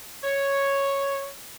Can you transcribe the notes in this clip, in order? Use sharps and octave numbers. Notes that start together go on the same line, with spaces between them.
C#5